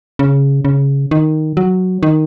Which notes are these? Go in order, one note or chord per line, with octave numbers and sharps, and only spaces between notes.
C#3
C#3
D#3
F#3
D#3